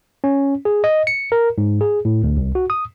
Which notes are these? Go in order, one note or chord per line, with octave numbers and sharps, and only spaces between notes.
C#4
G#4
D#5
C#7
A#4
G#2
G#4
A2
D2
C2
F#4
D#6